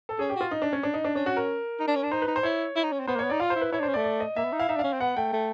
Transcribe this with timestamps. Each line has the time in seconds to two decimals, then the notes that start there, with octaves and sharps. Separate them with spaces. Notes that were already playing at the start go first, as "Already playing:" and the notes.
0.09 A4
0.19 C#4 G#4
0.30 G4
0.36 F4 F#4
0.51 D#4
0.62 D4
0.73 C#4
0.83 D4
0.94 D#4
1.04 D4
1.15 C#4 D4
1.26 F#4
1.37 A#4
1.80 D#4
1.88 D4
1.96 C#4
2.04 D4
2.12 D#4 C5
2.22 B4
2.28 D#4
2.36 C5
2.43 E4 C#5
2.76 E4
2.84 D#4
2.92 C#4
3.00 C4
3.07 B3 C5
3.16 A#3
3.19 C#5
3.24 B3
3.30 D#4 D5
3.40 F4 F5
3.50 C5
3.56 E4
3.61 B4
3.72 E4 C#5
3.80 D4
3.83 C5
3.88 C#4
3.94 D5
3.96 A3
4.04 D5
4.20 D#5
4.36 A#3 E5
4.45 B3
4.53 D#4
4.59 E4 F5
4.69 D#4 E5
4.76 D4
4.79 F5
4.84 C#4
4.93 C4
5.00 B3 F#5
5.17 A3 G5
5.33 A3